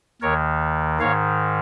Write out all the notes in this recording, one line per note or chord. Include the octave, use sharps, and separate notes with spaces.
D#2 D#3 A#4 C#5
G#2 D#3 C#5 F5